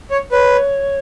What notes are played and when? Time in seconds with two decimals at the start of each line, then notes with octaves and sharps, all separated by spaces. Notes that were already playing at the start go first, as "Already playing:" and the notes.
0.11 C#5
0.32 B4 C#5